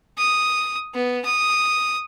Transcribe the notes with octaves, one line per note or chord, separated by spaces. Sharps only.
D#6
B3
D#6